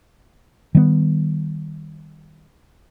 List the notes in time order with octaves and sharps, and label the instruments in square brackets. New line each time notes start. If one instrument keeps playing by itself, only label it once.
[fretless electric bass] D#3 G3 B3